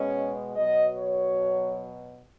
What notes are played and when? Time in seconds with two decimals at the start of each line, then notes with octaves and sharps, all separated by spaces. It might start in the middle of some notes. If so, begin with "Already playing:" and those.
Already playing: B2 G#3 C#4
0.56 B2 F#3 D#5
0.98 C#5